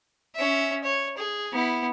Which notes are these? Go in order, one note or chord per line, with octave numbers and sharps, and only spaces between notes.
C#4 E5
C#5
G#4
B3 E4